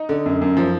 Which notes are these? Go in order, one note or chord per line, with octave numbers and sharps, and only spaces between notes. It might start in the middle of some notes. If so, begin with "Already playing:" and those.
Already playing: D#4
D3
F#2
F#2
F3